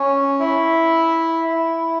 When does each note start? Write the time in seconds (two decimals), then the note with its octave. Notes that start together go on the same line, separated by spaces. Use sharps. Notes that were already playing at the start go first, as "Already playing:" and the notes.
Already playing: C#4
0.40 E4
1.48 E4